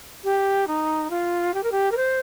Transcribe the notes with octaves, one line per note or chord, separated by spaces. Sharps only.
G4
D#4
F4
G4
A#4
G4
A#4
C5